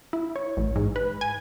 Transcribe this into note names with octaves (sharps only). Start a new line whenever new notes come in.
E4
C#5
A1
G#2
B4
G#5